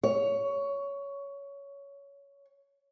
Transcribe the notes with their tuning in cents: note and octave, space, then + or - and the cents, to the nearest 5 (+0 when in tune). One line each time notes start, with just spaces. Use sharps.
C#5 +15